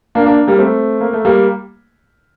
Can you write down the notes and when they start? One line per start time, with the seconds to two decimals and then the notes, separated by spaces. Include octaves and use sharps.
0.15 A#3 D4
0.26 A#3 D4
0.47 G3 A#3
0.58 A3 C4
1.01 A#3
1.13 A3
1.25 G3 A#3